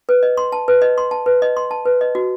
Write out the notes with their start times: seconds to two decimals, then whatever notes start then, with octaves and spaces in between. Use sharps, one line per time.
0.09 B4
0.23 D#5
0.37 C6
0.52 A5
0.68 B4
0.82 D#5
0.98 C6
1.11 A5
1.26 B4
1.42 D#5
1.57 C6
1.71 A5
1.85 B4
2.01 D#5
2.15 F#4